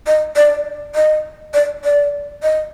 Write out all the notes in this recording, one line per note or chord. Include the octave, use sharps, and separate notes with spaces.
D#5
D5
D#5
D5
D5
D#5